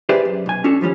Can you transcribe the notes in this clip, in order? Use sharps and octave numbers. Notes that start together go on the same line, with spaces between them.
G4 G#4 B4 C5 D5 E5
F#2
B1 G#5
C#4 D4 F#4 A4
D#2 F3 G3 C#4